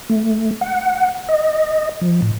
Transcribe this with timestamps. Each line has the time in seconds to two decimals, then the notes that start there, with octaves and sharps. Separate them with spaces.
0.10 A3
0.61 F#5
1.28 D#5
2.01 F3
2.22 A2